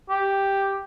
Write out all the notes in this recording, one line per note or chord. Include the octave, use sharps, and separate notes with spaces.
G4